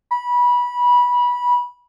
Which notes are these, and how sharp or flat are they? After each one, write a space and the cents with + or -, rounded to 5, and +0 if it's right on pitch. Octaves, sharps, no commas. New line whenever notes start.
B5 -20